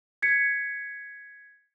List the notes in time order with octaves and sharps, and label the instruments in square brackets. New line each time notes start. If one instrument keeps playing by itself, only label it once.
[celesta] G#6 B6 C#7